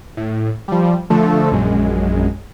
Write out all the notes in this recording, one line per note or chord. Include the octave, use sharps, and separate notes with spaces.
A2
F3 G3
D3 F3 A3 A4
A#1 F#2 G#3